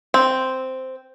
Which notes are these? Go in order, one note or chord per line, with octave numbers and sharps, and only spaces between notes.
C4